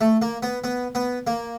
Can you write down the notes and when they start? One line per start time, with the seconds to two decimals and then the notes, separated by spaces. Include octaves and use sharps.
0.01 A3
0.22 A#3
0.43 B3
0.64 B3
0.95 B3
1.27 A#3